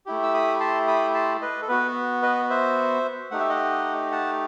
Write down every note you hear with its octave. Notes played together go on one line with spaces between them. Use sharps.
A3 E4 G4
E6
B5 D#6
A5 C6
B5 D#6
A5 C6
B4 D#5
A4
B3 F#4 B4
B4 D#5
C5 E5
A3 D#4 G4 F#5
E5
D#5 F#5
F#5 A5